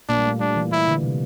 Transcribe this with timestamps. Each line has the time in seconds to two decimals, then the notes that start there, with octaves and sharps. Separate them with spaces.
0.09 A#2 A#3 D4
0.18 G3
0.25 A3
0.40 G3 D4
0.56 E3
0.71 E3 E4
0.88 D3
1.03 C3